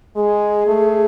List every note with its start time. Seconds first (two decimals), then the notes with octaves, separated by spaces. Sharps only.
0.16 G#3 G#4
0.67 A3